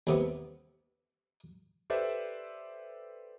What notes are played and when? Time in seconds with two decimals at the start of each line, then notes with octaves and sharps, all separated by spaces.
0.07 D#2 C3 B3
1.90 G4 A4 B4 C5 D5 E5